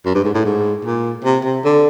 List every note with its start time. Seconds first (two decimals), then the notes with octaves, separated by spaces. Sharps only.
0.06 F#2
0.15 G2
0.25 G#2
0.35 A2
0.45 G#2
0.85 A#2
1.25 C3
1.45 C3
1.65 D3